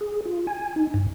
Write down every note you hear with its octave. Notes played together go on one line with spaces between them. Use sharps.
G#4
F4
G#5
D#4
G2